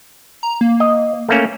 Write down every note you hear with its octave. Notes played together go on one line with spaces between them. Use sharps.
A#5
A#3
D#5
A3 A#3 C#4